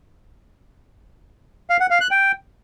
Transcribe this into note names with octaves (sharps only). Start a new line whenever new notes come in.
F5
F#5
F5
F#6
G5